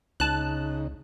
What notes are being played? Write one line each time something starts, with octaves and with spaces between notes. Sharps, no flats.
C#2 C#3 D#4 A5 F#6